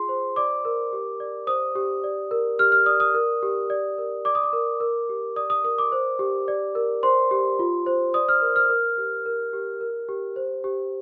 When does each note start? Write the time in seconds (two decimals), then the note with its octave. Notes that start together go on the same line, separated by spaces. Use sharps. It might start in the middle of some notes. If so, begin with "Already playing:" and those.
Already playing: F4 G#4 C6
0.09 C5
0.36 D5 D6
0.65 A#4
0.93 G4
1.20 D5
1.47 C5 D#6
1.75 G4
2.04 D5
2.31 A#4
2.59 G4 F6
2.72 F6
2.86 D5 D#6
3.00 D#6
3.14 A#4
3.43 G4
3.70 D5
3.98 A#4
4.25 D5 D6
4.35 D#6
4.43 D6
4.53 A#4
4.80 A#4
5.09 G4
5.36 D5 D#6
5.50 D#6
5.64 A#4 D#6
5.78 D6
5.92 C5
6.19 G4
6.48 D5
6.75 A#4
7.03 C5 C6
7.31 G4
7.59 F4
7.86 C5
8.14 D5 D#6
8.29 F6
8.42 A#4
8.56 F6
8.69 A#4
8.98 G4
9.26 A#4
9.53 G4
9.81 A#4
10.09 G4
10.36 C5
10.64 G4